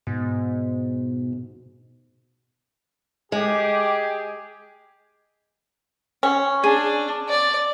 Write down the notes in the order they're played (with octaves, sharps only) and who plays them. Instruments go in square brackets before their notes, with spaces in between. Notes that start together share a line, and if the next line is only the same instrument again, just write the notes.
[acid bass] G#2 [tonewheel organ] B2
[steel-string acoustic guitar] G#3 [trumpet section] G4 G#4
[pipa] C#4
[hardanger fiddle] D4 [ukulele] G#4
[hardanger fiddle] D5